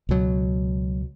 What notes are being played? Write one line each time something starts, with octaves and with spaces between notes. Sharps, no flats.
C#2 B2 F#3